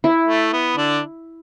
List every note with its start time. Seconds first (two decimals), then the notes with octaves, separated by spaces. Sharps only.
0.04 E4
0.27 A3
0.53 B3
0.76 D3 D4